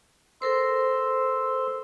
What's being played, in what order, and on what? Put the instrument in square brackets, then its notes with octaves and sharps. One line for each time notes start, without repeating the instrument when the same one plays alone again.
[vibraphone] A4 A#4 C5 [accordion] C6 E6